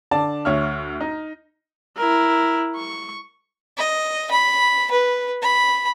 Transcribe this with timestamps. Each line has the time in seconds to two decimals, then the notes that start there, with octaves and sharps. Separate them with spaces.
0.11 D3 D5 A5
0.45 D2 C#5 E5 F6
1.01 D#4
1.97 E4 A#4
2.76 C#6
3.77 D#5
4.31 B5
4.91 B4
5.42 B5